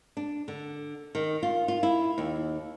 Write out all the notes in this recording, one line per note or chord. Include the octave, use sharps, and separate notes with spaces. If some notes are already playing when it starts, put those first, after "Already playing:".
D4
D3
D#3
F4
F4
E4
D#2